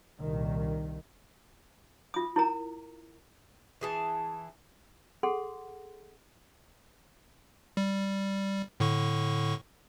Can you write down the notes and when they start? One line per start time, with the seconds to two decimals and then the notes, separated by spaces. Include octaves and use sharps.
0.19 C2 A#2 D#3
2.14 F4 D#6
2.36 E4 A#4 A#5
3.81 E3 G#4 A5
5.23 G#4 A4 F#5 C6
7.77 G3
8.80 A2 D3 C#6